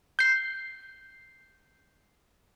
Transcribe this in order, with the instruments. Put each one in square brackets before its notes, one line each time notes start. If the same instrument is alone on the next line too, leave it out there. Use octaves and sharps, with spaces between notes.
[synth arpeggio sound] G6 C7